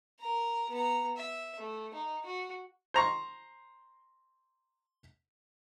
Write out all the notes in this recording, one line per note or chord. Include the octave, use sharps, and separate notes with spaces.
A#4 A#5
B3 A#5
E5
A3
D#4
F#4
C5 A#5 C#6